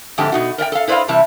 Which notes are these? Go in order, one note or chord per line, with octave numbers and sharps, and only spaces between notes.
F2 G#2 D3 A3 G4 A5
B2 D#4 F#4
A#4 D5 D#5 G5
A4 F5
E4 B4 C5 D5 D#5 F5
C3 E3 G3 E4 A5